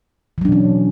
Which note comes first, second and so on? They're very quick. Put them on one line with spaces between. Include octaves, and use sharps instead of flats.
E3 F#3 D4 B2 C#4